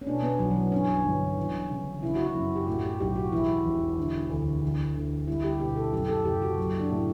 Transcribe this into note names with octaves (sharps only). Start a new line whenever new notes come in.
C#4
B2 D4
B3
B1 F#3
F#3
E3
G2 C#4
G1
E3
C#3
C#3 E4
F#4
E4
F#2
G4
A2 F#4
G4
B1 G4
F#4
E2 E4
E1
D3
D2
D3
D2
G3 E4
G4
B2 G4
A4
F#2 G4
A4
F#1 G4
F#4
F#3
D4
A2